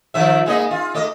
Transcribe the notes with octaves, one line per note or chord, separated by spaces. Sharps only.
D#3 F3 E5
G#3 A#3 D#5
F4
A3 D#5